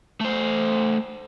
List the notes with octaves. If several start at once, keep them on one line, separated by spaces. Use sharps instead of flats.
A3 C5